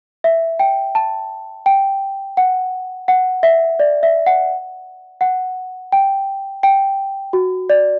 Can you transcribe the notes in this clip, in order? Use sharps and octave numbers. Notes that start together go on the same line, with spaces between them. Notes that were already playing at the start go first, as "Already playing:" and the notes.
E5
G5
A5
G5
F#5
F#5
E5
D5
E5
F#5
F#5
G5
G5
F#4
D5